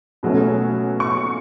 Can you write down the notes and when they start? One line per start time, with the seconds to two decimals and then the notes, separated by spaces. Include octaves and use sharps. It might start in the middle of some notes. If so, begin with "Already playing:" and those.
0.23 B2 F#3 A3 C#4
1.00 C#6